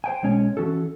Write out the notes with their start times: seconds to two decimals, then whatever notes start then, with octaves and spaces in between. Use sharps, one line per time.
0.04 C5 G5 G#5
0.23 B1 G#3 C#4 C#5 G#5
0.57 E3 C#4 F#4 A4